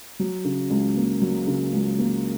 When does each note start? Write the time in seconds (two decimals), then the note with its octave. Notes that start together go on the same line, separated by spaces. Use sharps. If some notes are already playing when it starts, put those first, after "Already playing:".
0.19 F#3
0.45 C#3
0.70 C#2
0.96 A#3
1.21 F#3
1.47 C#3
1.73 C#2
1.99 A#3